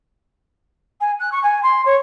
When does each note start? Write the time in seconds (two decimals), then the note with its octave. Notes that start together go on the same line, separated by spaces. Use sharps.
1.00 G#5
1.19 F#6
1.32 C#6
1.43 G#5
1.63 C6
1.85 C#5